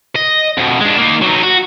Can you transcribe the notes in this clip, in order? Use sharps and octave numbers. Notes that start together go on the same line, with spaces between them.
D#5
F2 B2
G#3 D4
A#3 D#4
F#3 D#4
F#4